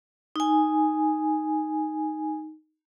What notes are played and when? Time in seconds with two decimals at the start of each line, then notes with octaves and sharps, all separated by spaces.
0.36 D#4 G#5